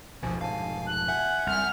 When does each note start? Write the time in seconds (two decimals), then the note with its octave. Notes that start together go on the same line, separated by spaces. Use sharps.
0.23 F1 C#2 G#2 B2 F3 G#5
0.41 F5 G#5 A5
0.87 F#6
1.08 E5 F#5 G#5 G6
1.47 C2 F6